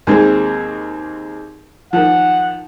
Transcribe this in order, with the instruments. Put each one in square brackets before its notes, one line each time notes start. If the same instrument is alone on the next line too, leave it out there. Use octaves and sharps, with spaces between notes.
[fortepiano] D#2 G#3 C4
[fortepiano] D#3 F3 [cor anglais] F#5